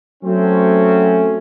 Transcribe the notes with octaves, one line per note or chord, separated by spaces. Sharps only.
F#3 A3 C4 C#4